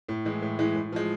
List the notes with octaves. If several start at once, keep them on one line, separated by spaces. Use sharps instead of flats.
A2
E3 G#3
A2
E3 G#3
A2
F3 G#3